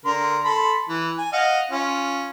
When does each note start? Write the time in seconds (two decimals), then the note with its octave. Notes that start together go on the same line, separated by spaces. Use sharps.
0.05 D3 A#4 C6
0.45 A4 B5 C6
0.89 E3
1.18 G#5
1.33 D#5 F5 F#5
1.71 C#4 F4